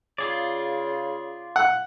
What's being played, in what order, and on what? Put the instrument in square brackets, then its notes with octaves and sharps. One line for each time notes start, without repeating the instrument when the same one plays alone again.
[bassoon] C#3 [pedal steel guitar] F4 G#4 D5
[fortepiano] F#5